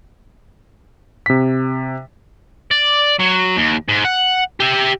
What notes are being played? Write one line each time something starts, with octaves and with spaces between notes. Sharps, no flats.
C3 B6
D5
F#3
D#2
G#2
F#5
G4 E5